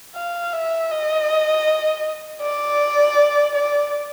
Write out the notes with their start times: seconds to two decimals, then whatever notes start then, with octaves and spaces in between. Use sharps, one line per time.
0.16 F5
0.53 E5
0.91 D#5
2.42 D5
3.55 D5